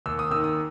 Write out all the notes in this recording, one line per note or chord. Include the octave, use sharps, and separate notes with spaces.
D#2 E6
D#6
D#3 E6
D#6